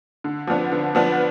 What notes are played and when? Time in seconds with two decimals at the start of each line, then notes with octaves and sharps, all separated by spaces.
0.24 D3
0.47 F3 B3 D4
0.72 D3
0.95 F3 B3 D4